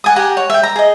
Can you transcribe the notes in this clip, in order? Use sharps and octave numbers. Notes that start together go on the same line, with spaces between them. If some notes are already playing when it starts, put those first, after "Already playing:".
F#5 G#5 D#6
G4 F#5 G#5 A#5
C#5
E5 G5
A#5
G#4 D#5